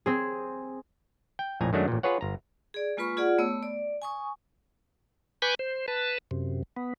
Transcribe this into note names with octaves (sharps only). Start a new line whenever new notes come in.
C4 G#4
G5
A#1 F2 A2 G#5 A#5
F#2 D#3 F#3 G#3 A3 D4
A1 A#2
F4 G#4 B4 C#5 F#5
G1 A#5
G#4 D5
G#3 A#3 F4 B4 B5 C#6
F4 G#4 D5 F#5
A3 B3 C#5 E6
D5
G#5 C#6 D#6
B4 G#5 B5 C#6 D6 G6
C5
B4 A5
F#2 C3
B3